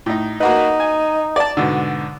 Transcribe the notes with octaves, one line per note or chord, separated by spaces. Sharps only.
A2 D#4
A#3 D#4 F#4 B4
G#5
D5 A5
G#2 B2 D3